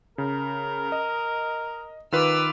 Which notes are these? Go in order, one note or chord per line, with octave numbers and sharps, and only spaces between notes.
C#3 A#4
D#5
D#3 F4 B4 D6 E6 F6